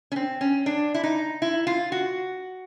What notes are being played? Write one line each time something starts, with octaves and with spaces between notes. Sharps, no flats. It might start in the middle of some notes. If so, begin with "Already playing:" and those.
C#4
C4
C#4
D4
E4
D#4
E4
F4
F#4